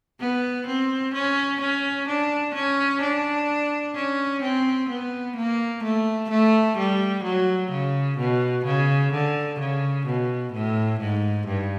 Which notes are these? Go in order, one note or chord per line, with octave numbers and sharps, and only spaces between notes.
B3
C4
C#4
C#4
D4
C#4
D4
C#4
C4
B3
A#3
A3
A3
G3
F#3
C#3
B2
C#3
D3
C#3
B2
A2
G#2
G2